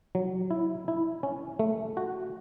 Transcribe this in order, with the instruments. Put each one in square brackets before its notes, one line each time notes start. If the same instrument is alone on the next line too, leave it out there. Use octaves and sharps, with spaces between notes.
[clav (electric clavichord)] F#3
E4
E4
C#4
A3
F#4